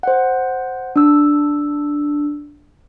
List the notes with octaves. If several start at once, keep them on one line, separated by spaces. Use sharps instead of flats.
C5 F#5
D4 E6